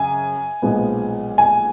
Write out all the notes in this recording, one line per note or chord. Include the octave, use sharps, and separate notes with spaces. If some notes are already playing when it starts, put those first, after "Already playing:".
Already playing: F#2 C#3 G#5
B1 A#2 F3 G#3 B3
G#5